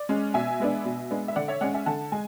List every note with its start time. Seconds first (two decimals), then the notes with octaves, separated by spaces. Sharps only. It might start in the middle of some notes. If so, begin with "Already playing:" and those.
Already playing: D5
0.09 G#3 C#4
0.34 B2 E5 G#5
0.60 G#3 B3 D4
0.85 B2
1.11 G#3 B3 D4
1.28 E5
1.36 D3 D5 F#5
1.48 C#5 E5
1.61 G#3 C#4 D5 F#5
1.74 E5 G#5
1.86 D3 F#5 A5
2.12 G#3 G#5